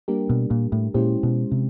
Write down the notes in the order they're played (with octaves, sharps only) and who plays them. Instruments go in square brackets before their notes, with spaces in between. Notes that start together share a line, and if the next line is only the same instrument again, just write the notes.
[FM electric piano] G3 A#3 D4 G4 A#4
[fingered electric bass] B2
A#2
A2
[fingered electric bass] A#2 [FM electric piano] G#3 C#4 E4 G4 C5
[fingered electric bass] B2
C3